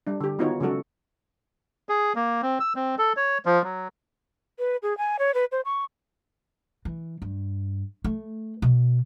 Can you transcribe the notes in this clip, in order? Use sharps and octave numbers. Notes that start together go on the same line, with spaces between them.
G3 D4
D3 G4
D#3 B3 D#4 F4 F#4 C#5
C#3 F#3 G#3 F#4 A4
G#4
A#3
C4
E6
C4
A4
C#5
F3
F#3
B4
G#4
G#5
C#5
B4
C5
C#6
E3
G2
A3
B2